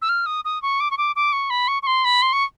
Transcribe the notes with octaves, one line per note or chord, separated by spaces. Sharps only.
E6
F6
D#6
D#6
C#6
D6
C#6
D6
D6
C#6
B5
C#6
C#6
C6
B5
C6
C#6